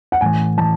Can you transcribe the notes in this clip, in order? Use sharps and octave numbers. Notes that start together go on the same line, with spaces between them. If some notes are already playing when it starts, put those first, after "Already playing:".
F#5
A2 E3 G#5
E3 A5